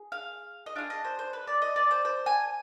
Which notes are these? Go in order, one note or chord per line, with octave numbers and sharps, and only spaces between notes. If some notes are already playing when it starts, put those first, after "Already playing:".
Already playing: G#4
F5
D#5
D4 F4 G#4 F5
D#5
C5
C5
B4
D5
D#5
D5
C5
C5
G#5